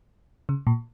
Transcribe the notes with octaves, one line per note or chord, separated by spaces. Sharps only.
C#3
A#2